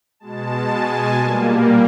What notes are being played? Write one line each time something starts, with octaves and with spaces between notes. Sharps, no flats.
B2 G#3 A5
G#5
A#2 G3 A#3